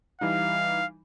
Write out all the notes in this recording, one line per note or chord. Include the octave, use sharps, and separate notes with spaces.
E3 G3 D#4 F5